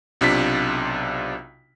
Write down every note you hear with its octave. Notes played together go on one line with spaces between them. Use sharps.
B1 C3 D4 F4 B6